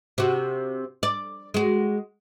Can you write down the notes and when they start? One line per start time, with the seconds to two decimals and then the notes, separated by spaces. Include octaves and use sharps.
0.18 C3 F#4
1.03 D5
1.54 G#3 F#4